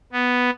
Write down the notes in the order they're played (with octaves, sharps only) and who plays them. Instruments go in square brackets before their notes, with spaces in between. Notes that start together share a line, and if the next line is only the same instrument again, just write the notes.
[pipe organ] B3